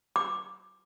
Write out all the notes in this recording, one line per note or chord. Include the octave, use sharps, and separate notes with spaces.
D6